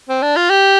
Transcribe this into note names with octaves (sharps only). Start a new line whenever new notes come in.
C4
D4
F4
G4